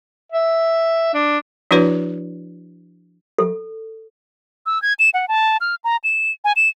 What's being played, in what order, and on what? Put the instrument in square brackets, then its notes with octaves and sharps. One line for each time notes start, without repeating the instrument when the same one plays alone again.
[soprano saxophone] E5
D4
[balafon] F3 D4 E4 F#4 B4 C#5
[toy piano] A4
[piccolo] E6
G#6
E7
F#5
A5
F6
A#5
E7
G#5
E7